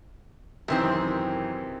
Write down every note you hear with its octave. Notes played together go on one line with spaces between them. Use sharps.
F#2 C3 D#3 E3 C4